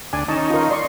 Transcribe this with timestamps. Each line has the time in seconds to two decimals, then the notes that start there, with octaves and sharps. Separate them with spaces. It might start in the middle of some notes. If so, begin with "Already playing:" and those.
0.13 D2 D4 G#5
0.28 D#3 C#4 D#4 A5
0.50 F4 A#4
0.70 D5 D#5 C6 C#6